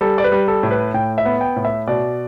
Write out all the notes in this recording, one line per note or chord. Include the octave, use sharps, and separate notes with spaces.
G3 A4
D5
B4
G3
A4
A2
B4
A2 G5
E5
B3
G5
A2
E5
B2 D5